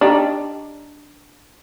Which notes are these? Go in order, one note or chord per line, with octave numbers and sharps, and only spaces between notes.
D4 D#4 G4